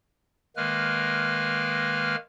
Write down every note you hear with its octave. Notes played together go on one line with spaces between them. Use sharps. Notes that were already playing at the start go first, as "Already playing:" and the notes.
D#3 G#3 A#3 B4 F6